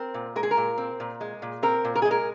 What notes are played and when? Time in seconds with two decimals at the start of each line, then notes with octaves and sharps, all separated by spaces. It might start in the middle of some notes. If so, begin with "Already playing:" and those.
Already playing: C4 A#4
0.14 A#2
0.36 G#3 A#4
0.43 G#4
0.51 A#4
0.57 A#2
0.78 C4
1.00 A#2
1.21 G#3
1.42 A#2
1.63 C4 A#4
1.85 A#2
1.95 A#4
2.02 G#4
2.05 G#3
2.11 A#4